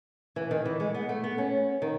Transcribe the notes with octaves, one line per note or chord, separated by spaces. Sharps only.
E3
D#3
E3
G#3
B3
A3
B3
C#4
D#3